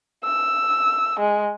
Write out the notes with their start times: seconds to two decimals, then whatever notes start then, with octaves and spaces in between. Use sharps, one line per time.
0.24 E6
1.20 G#3